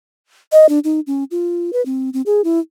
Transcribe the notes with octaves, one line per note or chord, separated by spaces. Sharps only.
D#5
D4
D#4
C#4
F4
B4
C4
C4
G#4
E4